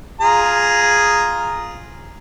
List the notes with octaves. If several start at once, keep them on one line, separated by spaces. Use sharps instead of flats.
F4 G#4 A#5